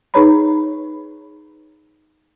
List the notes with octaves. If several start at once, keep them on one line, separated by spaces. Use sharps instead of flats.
D#4 G#4 B4 C#5 A#5 B5